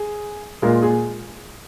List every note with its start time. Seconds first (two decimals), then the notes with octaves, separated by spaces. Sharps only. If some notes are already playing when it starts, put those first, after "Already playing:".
Already playing: G#4
0.62 A#2 G#3 F4 A#4
0.82 G#4